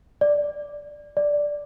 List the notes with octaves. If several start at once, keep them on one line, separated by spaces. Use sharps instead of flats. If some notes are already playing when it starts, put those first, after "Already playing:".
D5
D5